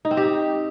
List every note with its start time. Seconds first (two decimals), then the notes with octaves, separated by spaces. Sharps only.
0.05 D#4
0.11 C4
0.17 G4